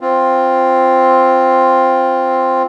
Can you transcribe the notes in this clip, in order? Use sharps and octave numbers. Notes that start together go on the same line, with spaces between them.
C4 F4